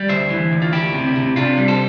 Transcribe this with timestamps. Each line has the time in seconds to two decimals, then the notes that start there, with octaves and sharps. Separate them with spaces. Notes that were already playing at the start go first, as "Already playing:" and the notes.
Already playing: G3
0.09 D2 C5 E5
0.30 E3
0.52 D2
0.62 F4
0.73 D2 E4 G4
0.94 C3
1.16 C3
1.36 C3 D4 F4
1.58 G3
1.68 A4 C5